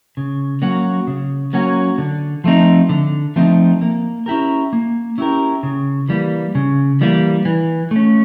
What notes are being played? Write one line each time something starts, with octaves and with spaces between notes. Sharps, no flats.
C#3
F#3 A#3 C#4 F#4
C#3
F#3 A#3 C#4 F#4
D3
F3 A3 C4 D#4
D3
F3 A3 C4 D#4
A#3
C#4 E4 G4 A#4
A#3
C#4 E4 G4 A#4
C#3
E3 G3 A#3
C#3
E3 G3 A#3
E3
A3 C#4